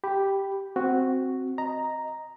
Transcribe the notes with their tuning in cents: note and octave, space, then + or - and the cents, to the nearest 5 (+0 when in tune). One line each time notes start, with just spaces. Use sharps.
G4 +0 B5 +0
C4 +0 F#4 +0
D#5 +0 A#5 +0